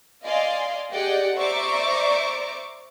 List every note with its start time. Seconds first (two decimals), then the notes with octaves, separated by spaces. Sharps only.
0.24 D5 D#5 F5 G#5 C6
0.92 G4 G#4 D5 D#5 F#5 G5
1.36 C5 D5 E5 A#5 C#6 D6